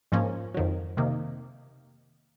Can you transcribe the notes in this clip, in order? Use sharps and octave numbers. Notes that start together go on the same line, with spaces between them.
G#2 F3 A#3 C#4
F2 D#3 F#3
C3 D#3 A#3